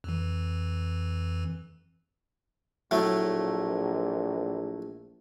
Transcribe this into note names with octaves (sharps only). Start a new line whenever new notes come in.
F2 E3
A#1 A2 F#3 A3